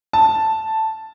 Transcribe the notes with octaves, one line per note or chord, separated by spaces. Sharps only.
A5